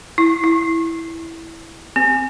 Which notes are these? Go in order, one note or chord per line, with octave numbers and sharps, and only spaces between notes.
E4
E4
C4